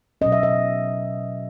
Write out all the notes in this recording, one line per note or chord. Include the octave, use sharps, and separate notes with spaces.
B2 F#3 C#4 D#5
E5
D#5